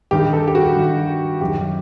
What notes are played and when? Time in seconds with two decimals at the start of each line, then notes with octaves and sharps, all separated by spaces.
0.11 G2 D#3 G4
0.33 A4
0.48 G4
0.55 F#4
0.76 G2 D#3
1.41 F#2 D#3 G4